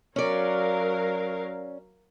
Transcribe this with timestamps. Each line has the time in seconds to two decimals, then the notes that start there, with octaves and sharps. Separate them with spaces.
0.16 F#3 C#4 A#4 D5 F5